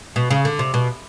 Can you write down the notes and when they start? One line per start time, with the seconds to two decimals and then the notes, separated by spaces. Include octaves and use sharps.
0.16 B2
0.31 C#3
0.45 D3
0.59 C3
0.74 B2